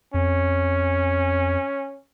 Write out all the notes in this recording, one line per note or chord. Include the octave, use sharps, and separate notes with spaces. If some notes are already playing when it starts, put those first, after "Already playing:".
F2 C#4